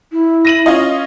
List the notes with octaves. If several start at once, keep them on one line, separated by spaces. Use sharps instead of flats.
E4
A#6 D#7 F#7
C#4 F4 D#5